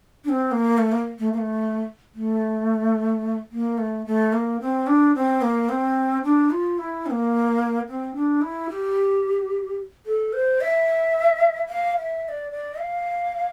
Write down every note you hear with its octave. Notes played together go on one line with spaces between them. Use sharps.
D4
C4
A#3
A3
A#3
A3
A#3
A3
A3
A#3
A3
A3
A#3
C4
D4
C4
A#3
C4
D4
F4
E4
C4
A#3
C4
D4
E4
G4
A4
C5
E5
F5
E5
E5
D5
D5
F5